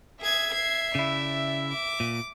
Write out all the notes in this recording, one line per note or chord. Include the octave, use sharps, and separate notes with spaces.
G#4 E5 G#6
G#6 C7
C#3 E4 D5
D6
A#2